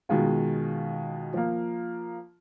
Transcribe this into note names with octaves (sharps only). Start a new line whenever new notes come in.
B2 D#3 G#3 F4
F3 A#3